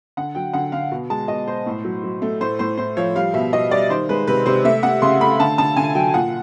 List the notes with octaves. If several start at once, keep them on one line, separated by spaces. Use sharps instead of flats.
D3 F#5
F#3 G5
D3 F#5
D3 F5
B2
G#3 A5
B2 D#5
B2 C5
A2
F#3
F#3
A3
A2 C5
A2 C5
A2 C5
F3 C#5
G3 F5
B2 E5
B2 D#5
G3 D5
D#3 C5
G#3 B4
C3 B4
C3 C5
A3 E5
A3 F#5
C#3 C6
A3 B5
D3 A5
D3 A5
D3 G#5
F#3 G5
A#2 F#5